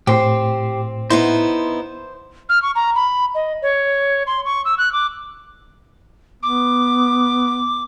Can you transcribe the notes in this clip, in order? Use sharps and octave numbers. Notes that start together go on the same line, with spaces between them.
A2 C4 G4 C5
B3 D#4 E4 C5
F6
C#6
A#5
B5
D#5
C#5
C6
C#6
E6
F#6
D6
B3 D6